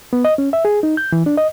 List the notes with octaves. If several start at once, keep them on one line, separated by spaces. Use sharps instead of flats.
B3
D#5
C#4
E5
G#4
D#4
G6
E3
D4
D#5